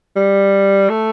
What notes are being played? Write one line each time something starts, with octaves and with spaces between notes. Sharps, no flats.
G3
A3